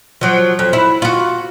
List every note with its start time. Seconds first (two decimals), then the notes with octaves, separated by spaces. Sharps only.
0.21 F3 F#3
0.59 F2
0.73 E4
1.02 F4 F#4